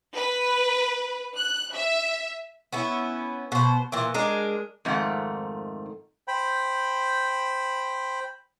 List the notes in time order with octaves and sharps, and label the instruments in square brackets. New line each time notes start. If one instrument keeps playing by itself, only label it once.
[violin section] B4
F#6
E5
[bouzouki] B3 C#4 E4
B2 C5
A#2 E3
G#3 D4 A#4
[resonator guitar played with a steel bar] F2 G#2 D#3 A3 F#5
[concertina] C5 G5 B5